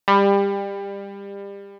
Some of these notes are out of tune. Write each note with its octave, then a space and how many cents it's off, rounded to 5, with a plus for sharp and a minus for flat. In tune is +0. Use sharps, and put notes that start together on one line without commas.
G3 +25